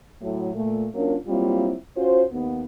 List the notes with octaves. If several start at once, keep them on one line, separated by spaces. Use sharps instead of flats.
A2 F#3
A#2 A3
F#3 A#3 C#4 D4 F4 A#4
F#3 G3 A#3 C4 E4 F4
C#4 F4 F#4 C5
D#2 B3